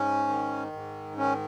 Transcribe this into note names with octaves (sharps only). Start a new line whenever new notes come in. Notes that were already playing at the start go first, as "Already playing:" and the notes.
Already playing: G#2 C#4
D#3
G#2
D#3 C#4